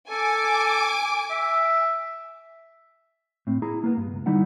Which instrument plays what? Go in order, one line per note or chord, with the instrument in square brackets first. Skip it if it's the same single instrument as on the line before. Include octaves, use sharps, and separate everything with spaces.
[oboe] A4 [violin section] G#5 D6
[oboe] E5
[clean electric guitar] A2 C4
E4 G#4 A#5
A#3 B3
G2
C#2
D3 G3 D#4 E4 F#5